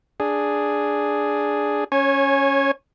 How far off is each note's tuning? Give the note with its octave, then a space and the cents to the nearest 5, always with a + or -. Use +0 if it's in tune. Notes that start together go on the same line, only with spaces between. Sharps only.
D4 +0 G#4 +0
C#4 +0 C#5 -25 G#5 +0